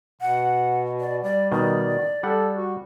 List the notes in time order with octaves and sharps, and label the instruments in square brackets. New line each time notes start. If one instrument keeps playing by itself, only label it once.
[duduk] B2 [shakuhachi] F#5
[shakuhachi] D5
[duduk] G3 [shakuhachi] D5
[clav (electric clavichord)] B2 D#3 [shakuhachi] D5
[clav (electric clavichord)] G3 F#5 [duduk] A4
[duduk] F#4